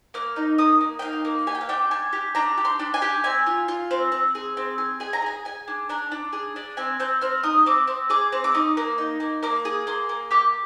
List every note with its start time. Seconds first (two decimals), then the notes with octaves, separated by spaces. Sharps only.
0.14 A#3 F6
0.36 D#4
0.58 A#3 D#6
0.81 A#3
0.99 G5
1.02 D#4 F5
1.25 A#3
1.47 G4 G#5
1.55 G5
1.61 F5
1.69 D4 G5
1.91 D4 G#5
2.13 G4
2.35 D4 A#5
2.58 G4
2.65 C6
2.79 D4
2.94 G#5
3.02 G4
3.24 C4 G#5
3.47 F4
3.68 F4
3.91 C4
4.12 C4
4.35 G#4
4.57 C4
4.78 G#4
5.00 G#4 G#5
5.13 A#5
5.22 G#4 G#5
5.45 G#4 G#5
5.68 D4
5.89 D4 A#5
6.12 D4
6.33 G#4
6.56 D4
6.77 C4 G#5
7.00 C4 G6
7.21 C4 F6
7.43 D#4 D#6
7.66 C4 D6
7.87 C4
8.10 G#4 D6
8.32 C4
8.44 D6
8.54 D#4 D#6
8.77 A#3
8.98 D#4
9.20 A#3
9.43 A#3 D6
9.65 G#4
9.87 A#3 C6
10.09 A#3
10.31 G4 D6